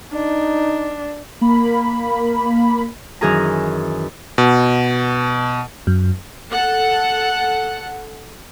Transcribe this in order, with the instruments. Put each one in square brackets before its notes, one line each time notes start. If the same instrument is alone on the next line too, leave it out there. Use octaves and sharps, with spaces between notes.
[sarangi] D4 [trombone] D#4
[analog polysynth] A#3 B5
[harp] F#2 D#3 E3 G#4 A#4 A#5
[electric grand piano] B2
[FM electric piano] F#2
[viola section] A4 F#5